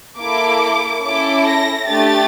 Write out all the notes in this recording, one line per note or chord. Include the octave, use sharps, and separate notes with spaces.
A#3 E4 A4 D6
C#4 E4 A4 D6
A#6
A3 D4 G4 A6